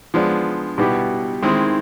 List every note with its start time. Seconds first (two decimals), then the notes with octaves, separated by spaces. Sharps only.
0.14 F3 G#3 B3 D4
0.78 B2 G3 B3 E4 G4
1.43 D#3 G#3 C4 E4 G#4